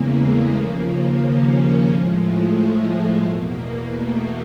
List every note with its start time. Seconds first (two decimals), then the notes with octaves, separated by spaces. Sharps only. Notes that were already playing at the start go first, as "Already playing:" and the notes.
Already playing: E2 C#3 E3 G#3 A#3
0.20 A3
0.54 D#2 C#3 F3 A#3
1.21 C#4
1.88 A2 F3 G#3
2.22 A3
2.55 A3
3.23 E2 B2 A#3
3.90 A3